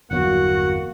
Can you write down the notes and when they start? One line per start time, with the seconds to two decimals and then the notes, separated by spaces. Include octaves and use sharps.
0.11 G1 E2 F#3 A#3 F#4 F#5